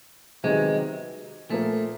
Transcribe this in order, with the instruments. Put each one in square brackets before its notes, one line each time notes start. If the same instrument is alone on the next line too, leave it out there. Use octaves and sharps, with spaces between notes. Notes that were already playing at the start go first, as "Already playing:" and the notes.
[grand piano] C3 D#3 F#3 B3 [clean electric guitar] G#3
[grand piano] A#2 F3 A#3 [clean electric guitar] A3